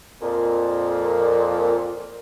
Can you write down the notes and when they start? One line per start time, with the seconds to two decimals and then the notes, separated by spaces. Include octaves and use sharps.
0.21 F2 A#2